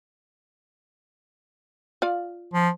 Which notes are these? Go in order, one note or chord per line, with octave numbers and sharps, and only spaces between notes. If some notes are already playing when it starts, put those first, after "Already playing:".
F4 D5 F5
F3